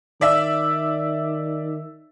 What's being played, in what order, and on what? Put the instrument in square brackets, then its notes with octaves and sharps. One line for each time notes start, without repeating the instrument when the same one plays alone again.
[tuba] D#3 [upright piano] D5 E5 E6